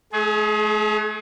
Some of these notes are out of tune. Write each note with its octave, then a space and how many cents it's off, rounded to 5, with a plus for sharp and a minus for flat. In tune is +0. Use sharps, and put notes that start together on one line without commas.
A3 -35 G#4 +25